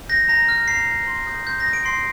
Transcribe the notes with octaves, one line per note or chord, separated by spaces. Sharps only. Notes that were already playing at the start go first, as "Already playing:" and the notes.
G6 A#6
A#5 A#6
F6
A#5 C7
F6
C6
D#6 G6
C6 G6
A#6
D#6 G6
D7
C6 C7